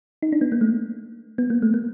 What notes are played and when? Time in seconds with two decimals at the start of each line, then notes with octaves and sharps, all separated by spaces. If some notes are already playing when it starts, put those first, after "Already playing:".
0.22 D#4
0.32 D4
0.41 B3
0.52 A#3
0.61 A3
1.38 B3
1.50 A#3
1.62 A3
1.74 A#3